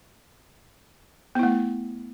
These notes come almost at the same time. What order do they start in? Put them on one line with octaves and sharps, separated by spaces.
B3 E4 A3